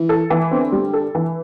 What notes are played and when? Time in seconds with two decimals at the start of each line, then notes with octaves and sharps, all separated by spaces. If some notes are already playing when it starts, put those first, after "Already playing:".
Already playing: E3
0.09 A4
0.30 E3
0.51 D3 C4
0.72 G3
0.93 A4
1.15 E3